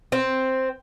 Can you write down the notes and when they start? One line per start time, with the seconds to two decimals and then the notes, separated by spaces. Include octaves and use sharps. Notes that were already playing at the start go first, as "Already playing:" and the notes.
0.12 C4